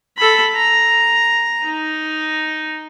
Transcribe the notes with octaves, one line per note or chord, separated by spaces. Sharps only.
A4 B5
A#5
D#4